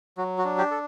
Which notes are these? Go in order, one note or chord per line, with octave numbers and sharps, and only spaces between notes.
F#3 F#4
F#4
D4
G4
A4